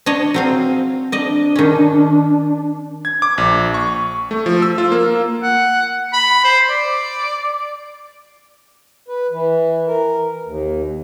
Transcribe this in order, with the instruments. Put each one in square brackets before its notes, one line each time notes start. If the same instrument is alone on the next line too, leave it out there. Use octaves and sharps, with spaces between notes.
[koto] D4 C#5 D#5
F#3 C4 F5
[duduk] D4 [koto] D5 D#5
[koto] D#3 C#4
[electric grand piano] G#6
D6
A#1
C#6
A3
F3
E6
F4
A#3
[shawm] F#5
B5
C5
D5
[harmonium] B4
E3
A#4
D#2